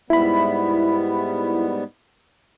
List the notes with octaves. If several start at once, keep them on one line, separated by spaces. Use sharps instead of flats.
G#2 G3 B3 E4 B5